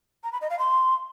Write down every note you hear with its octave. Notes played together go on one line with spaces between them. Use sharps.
A#5
B5
D#5
F5
C6